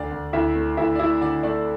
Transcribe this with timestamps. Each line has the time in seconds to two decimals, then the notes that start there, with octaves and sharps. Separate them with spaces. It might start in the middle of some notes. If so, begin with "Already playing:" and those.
Already playing: D2 D4 D5
0.11 D2
0.33 D2 E4 E5
0.56 A3
0.77 D2 E4 E5
0.95 D5
0.99 A3 E4 E5
1.21 D3 D4 D5
1.43 A3 D4 D5